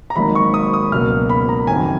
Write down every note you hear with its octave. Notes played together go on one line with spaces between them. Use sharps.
A#5
G#1 G#2 F#3 A#3 D#4 B5
C#6
D#6
D#6
C#2 B2 F#3 A#3 F6
B5
A#5
F#1 F2 D#3 F#3 G#5